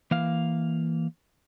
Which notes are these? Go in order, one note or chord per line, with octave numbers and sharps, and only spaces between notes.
E3 A#3 F5